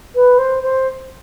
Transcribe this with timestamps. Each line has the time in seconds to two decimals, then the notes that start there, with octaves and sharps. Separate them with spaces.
0.15 B4
0.38 C5
0.62 C5